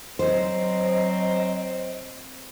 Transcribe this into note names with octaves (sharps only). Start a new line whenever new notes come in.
F#3 C4 C5 D#5